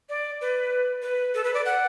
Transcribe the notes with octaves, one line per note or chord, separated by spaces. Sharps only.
D5
B4
B4
A4
B4
D5
F#5